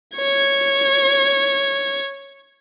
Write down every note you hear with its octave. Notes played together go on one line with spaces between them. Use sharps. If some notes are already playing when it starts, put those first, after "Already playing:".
C#5 G#6